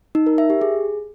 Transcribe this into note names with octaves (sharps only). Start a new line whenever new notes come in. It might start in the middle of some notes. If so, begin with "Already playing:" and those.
D#4
A#4
E5
G4
G#4